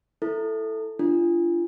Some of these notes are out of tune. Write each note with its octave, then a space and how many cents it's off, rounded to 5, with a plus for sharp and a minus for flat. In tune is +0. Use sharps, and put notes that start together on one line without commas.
E4 +0 A4 +0
D4 +0 F4 -30